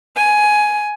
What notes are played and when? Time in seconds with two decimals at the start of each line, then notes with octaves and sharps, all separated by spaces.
0.15 G#5